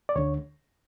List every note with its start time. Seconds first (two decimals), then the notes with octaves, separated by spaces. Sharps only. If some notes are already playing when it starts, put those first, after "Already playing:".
0.09 D5
0.16 D2 D3 C#5